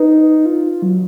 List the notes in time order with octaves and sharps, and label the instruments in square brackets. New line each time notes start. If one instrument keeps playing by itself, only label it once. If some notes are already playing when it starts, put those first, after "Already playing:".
Already playing: [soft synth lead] D#4 [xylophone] B4
[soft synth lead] F4
F4
F#3